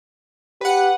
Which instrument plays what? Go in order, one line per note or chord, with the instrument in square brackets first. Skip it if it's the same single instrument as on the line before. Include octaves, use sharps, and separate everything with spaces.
[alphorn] G4 [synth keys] B4 F#5